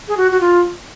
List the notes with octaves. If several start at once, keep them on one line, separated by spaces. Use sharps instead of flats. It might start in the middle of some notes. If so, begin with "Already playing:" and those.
G#4
F#4
F#4
F4